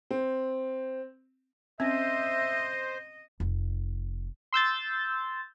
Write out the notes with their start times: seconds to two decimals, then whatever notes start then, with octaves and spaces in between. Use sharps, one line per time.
0.11 C4
1.80 C4 C#4 C5 D#5 E5
3.40 F1
4.53 C6 E6 G6 A6